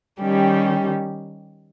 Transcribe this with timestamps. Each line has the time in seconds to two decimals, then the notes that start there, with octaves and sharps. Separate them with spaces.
0.21 D#3 G3 C#4 G4